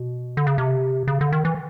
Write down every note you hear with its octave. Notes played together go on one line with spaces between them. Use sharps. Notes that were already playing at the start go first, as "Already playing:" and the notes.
Already playing: B2
D3
C#3
C3
C#3
D3
D#3
E3